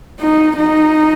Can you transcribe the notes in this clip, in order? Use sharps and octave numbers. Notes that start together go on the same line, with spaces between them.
D#4
D#4